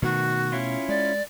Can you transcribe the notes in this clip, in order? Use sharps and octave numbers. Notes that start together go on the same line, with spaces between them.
B2 D#3 A3 F#4
C#4 E4 F4
G#3 D5